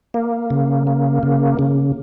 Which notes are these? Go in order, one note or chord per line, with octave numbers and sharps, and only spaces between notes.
A#3
C#3
A#3
C#3
C#3